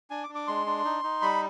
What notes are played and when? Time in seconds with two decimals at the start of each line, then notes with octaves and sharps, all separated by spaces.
0.10 D4 G#5
0.24 D6
0.29 D4
0.35 D6
0.47 G#3 C6
0.66 D4
0.85 D#4
1.04 D#4
1.22 G3 B5